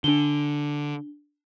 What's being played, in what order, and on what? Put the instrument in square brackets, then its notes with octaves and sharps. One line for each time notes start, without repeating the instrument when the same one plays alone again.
[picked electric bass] D3 [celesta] D4 G7